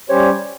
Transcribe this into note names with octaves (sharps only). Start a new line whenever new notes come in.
G3 C#4 G4 C5 C#5